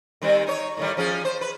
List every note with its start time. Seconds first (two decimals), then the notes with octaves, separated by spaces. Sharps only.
0.22 D#3 G3 C4
0.47 D#4 C#5
0.77 A2 D#3 G3
0.97 F3 C#4 G#4
1.25 C5
1.41 B4